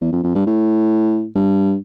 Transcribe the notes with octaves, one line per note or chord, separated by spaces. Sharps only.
E2
F2
F2
G2
A2
G2